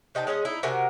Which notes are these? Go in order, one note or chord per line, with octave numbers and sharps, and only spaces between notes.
C3 D#4 G5 A5
G#3 C#4 G#4 D#5
D#4 E4
C3 F#4 A#4 G#5